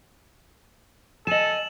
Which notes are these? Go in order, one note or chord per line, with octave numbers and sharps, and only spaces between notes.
A4 D#5 G#5 E7 F#7